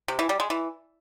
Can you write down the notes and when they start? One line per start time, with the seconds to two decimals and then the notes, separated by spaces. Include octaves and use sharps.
0.08 C3
0.19 E3
0.29 G3
0.40 G#3
0.50 E3